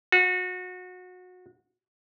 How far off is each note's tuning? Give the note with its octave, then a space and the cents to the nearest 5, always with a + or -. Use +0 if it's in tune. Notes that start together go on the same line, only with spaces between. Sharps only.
F#4 -25